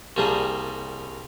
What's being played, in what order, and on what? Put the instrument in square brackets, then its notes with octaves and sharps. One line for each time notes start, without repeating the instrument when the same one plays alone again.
[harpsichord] C2 G3 A#3 G#4 A5 D#6